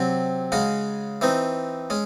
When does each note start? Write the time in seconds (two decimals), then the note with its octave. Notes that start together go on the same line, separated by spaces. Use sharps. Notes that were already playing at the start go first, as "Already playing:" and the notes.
Already playing: C3 F#3 C4
0.52 C#3 G#3 C#4 F#4
1.21 E3 C4 D#4
1.90 G#3 C#4